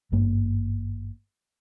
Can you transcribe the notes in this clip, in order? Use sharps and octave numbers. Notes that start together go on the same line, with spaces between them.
G#1 G2 A#3